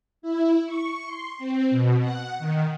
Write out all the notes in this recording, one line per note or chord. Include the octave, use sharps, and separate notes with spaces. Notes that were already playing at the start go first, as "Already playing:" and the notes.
E4
C#6
C6
C4
B2
F#5
D#3